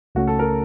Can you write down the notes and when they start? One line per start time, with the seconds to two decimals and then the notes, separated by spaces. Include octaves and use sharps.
0.15 C#2 C#3 A3 C#4 F#4
0.27 A4
0.39 A#4